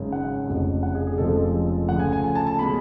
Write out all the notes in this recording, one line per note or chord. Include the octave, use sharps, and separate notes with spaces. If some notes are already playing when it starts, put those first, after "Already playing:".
Already playing: G#1 F#2 C#3 G#3
F#5
F1 F2 C#3
F#5
G#4
G#4
F1 F2 C#3 F3 G#3 A4
D2 C#3 F3 F#5
G#5
G#5
G#5
A5
A5
B2 G#3 B5